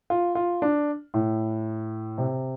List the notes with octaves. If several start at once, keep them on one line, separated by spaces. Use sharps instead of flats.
F4
F4
D4
A2
C3